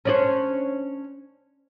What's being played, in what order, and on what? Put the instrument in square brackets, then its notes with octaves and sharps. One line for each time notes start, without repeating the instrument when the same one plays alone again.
[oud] C#4 D4 C5